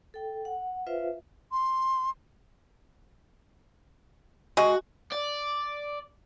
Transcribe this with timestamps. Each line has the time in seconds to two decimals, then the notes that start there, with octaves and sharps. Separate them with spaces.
0.14 A4 G5
0.45 F#5
0.87 F4 B4 C5 E5 F5
1.52 C6
4.57 G#3 F#4
5.12 D5